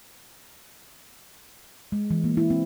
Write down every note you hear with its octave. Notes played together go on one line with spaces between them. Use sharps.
G#3
E3
A#3
E4
C4